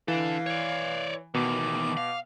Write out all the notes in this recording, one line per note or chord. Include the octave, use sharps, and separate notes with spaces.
E3 D4 A4 F5
C#5 D5
E2 B2 D#3 D6
F5